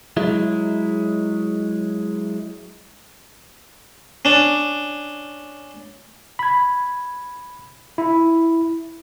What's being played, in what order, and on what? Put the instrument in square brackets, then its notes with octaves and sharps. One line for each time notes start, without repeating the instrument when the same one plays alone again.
[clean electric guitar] F#3 G#3 E4
[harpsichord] C#4 D4
[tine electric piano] B5 G#6
E4